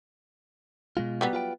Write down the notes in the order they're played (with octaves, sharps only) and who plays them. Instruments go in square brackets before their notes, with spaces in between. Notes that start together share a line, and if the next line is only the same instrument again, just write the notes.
[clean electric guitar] B2 G#3 F4
[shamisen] F#3 G3 B3
[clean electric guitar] F4 B4 G5